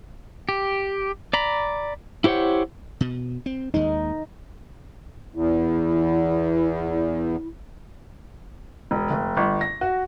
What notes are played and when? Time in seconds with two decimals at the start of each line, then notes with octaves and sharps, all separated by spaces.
0.49 G4
1.33 D5 A#5 B5
2.24 E4 G4 C5 C#5 F#5
3.01 B2
3.46 C4
3.74 D#2 G#3 D#4
5.35 E2 E4
8.91 E1
9.10 F1
9.37 G1
9.61 A#6
9.81 F#4